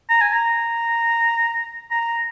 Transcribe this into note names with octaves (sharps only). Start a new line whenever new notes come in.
A#5
G#5
A#5
A#5